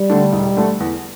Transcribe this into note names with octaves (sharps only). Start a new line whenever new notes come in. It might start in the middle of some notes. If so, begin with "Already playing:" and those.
Already playing: G3
D2 D3 A3 D4
E1
D2 D3 A3 D4
E2